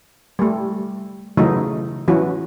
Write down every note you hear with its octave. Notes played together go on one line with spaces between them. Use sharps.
G3 A3
C#3 E3 F#3 A3 D#4
E3 F#3 C#4 F#4